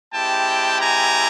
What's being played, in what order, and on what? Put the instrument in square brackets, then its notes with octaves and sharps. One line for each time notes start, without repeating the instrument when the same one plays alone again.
[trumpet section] G#3 C4 E4 G4 G5 A5
G#5 A#5